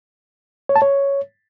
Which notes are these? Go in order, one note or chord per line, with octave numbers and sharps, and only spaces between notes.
C#5
A5
C#5